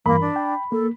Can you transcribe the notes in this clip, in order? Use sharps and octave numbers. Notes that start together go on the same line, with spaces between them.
G2 E3 A#3 A#4 B5
D4
G5
A#3 A4